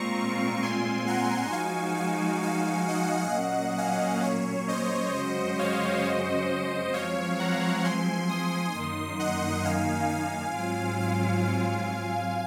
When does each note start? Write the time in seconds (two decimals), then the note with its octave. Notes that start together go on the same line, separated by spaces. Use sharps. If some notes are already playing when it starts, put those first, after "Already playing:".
Already playing: A#2 G#3 C4 F4 A#5 C#6
0.63 G#5 C6
1.07 F#5 A#5
1.53 F3 G#3 D#4 F#4 F5 G#5
1.97 F5 G#5
2.42 F5 G#5
2.88 D#5 F#5
3.33 A#2 F#3 A#3 C#4
3.78 F5 G#5
4.23 C#5
4.68 C5 D#5
5.13 F#2 C#3 G#3 C#4 F#4 C5 D#5
5.59 C#5 F5
6.04 C5 D#5
6.93 F3 G#3 C4 C#5 F5
7.39 F#5 A#5
7.84 G#5 C6
8.29 C6 D#6
8.74 F#2 D#3 A#3 D#4 C6 D#6
9.19 D#5 F#5
9.65 F5 G#5
10.10 F5 G#5
10.55 G#2 F#3 C4 F4
11.00 F5 G#5
11.45 F5 G#5